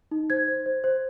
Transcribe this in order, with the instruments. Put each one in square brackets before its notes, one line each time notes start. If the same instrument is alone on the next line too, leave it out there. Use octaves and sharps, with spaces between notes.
[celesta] D#4
C5 G#6
C5
C5
C5